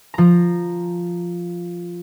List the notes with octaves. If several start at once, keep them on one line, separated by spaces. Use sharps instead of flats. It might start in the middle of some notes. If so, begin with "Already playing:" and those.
F3 A#5